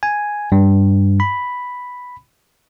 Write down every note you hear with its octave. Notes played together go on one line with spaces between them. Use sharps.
G#5
G2
B5